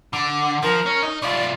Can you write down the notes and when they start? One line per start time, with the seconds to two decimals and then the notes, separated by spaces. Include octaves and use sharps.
0.13 D3 D6
0.63 F3 A#4
0.86 C#4
1.03 D#4
1.22 C2 F4 D5